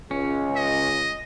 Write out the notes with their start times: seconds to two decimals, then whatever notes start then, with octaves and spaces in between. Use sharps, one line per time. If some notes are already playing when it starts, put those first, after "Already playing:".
0.11 C#2 C#4
0.56 D#5